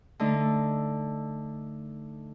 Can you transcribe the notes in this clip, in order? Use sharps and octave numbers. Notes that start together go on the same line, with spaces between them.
D3 A3 D#4